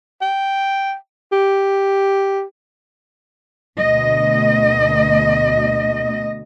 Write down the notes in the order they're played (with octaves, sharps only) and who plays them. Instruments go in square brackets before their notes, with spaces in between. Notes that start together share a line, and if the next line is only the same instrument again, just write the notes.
[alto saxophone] G5
G4
[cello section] D2 B2 D#5